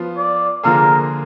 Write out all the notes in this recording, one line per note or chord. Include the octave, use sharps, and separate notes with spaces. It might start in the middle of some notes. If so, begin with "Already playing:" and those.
Already playing: F3 B3 F4
D5
D3 F3 A#3 F4 G#4 A#4